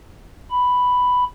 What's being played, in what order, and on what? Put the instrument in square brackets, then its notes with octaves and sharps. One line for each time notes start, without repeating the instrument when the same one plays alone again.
[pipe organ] B5